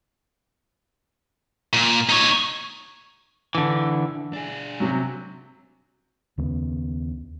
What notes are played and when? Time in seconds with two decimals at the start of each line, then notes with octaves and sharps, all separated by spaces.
1.73 A#2
2.09 D#4 C#5
3.55 D3 E3
4.33 D4 G#4
4.80 C3 F#3
6.38 D#2 C#3 B3